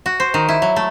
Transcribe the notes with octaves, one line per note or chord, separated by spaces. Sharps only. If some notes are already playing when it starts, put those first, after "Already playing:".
F#4
C5
D#3
E4
F#3
A3